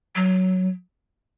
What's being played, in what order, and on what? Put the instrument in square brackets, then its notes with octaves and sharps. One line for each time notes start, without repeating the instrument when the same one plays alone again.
[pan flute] F#3